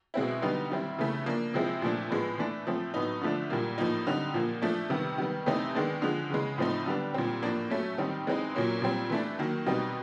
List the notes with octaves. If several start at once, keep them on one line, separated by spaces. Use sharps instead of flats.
B2 G#3 C4 E4
D3 G3 B3 D#4
D#3 G3 C4 E4
C#3 E3 A3
F3 A#3 D4
C3 F3 G#3 C4 E4
A#2 F3 A3 D4
A2 F3 G#3 B3
E3 A3 D4
F3 A3 C4
A2 F#3 B3 D#4
D3 F3 A3 D4
A#2 G3 A#3
A2 F3 A#3 D#4
D3 G3 C4 D#4
A#2 F3 A#3
F3 A3 D4
C3 D#3 G3 B3
D#3 G3 B3
C3 E3 A3 C4 D#4
D#3 G#3 B3 D4
D3 F3 G#3
C#3 E3 G#3
A2 F3 A3 C4 D#4
D3 G3 B3 D4
A#2 G3 C4
A2 F3 A#3 D4
F#3 A3 C#4
D#3 G3 C4 D#4
E3 G#3 C4 D#4
A#2 F#3 A#3 C#4
A#2 G3 C4
E3 A3 D4
D#3 F#3 A#3
B2 G3 C4 D#4